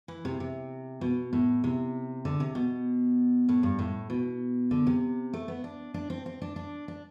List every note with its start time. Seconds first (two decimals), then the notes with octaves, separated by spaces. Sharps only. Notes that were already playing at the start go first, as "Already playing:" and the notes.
0.08 E3
0.25 C3
0.40 C3
1.01 B2
1.33 A2
1.64 C3
2.25 D3
2.40 C3
2.55 B2
3.49 A2
3.63 G2
3.79 A2
4.10 B2
4.71 D3
4.87 C3
5.33 A3
5.48 B3
5.64 D4
5.94 D4
6.10 C4
6.26 C4
6.42 D4
6.56 D4
6.88 D4